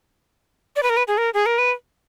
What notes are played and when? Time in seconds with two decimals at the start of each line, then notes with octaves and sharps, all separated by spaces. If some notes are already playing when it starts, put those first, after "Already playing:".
0.76 D5
0.83 B4
0.90 A#4
0.97 B4
1.08 G#4
1.18 A#4
1.34 G#4
1.46 A#4
1.58 B4